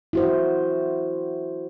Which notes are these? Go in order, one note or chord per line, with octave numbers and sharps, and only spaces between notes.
E4 F#4 C5